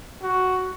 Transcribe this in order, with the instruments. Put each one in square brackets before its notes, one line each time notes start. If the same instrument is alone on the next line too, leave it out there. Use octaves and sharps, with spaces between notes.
[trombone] F#4